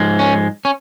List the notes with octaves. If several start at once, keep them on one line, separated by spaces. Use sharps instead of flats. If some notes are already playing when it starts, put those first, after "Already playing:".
Already playing: G#2 F3 G#3
C#4
C#4